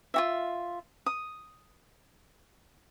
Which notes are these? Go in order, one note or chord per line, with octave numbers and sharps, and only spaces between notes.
F4 F#4 E5
D#6